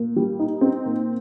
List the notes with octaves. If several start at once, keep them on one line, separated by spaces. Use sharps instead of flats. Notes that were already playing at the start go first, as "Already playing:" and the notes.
Already playing: A#2
G3
D#4
C4
A#2